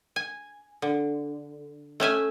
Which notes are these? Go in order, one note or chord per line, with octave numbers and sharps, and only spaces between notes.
G#5
D3
A3 C#4 E5 G#5